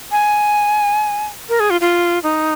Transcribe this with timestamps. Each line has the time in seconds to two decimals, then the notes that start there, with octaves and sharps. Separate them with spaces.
0.12 G#5
1.49 A#4
1.60 G#4
1.70 F4
1.81 F4
2.23 D#4